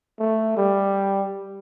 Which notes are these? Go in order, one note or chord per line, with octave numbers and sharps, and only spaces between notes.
A3
G3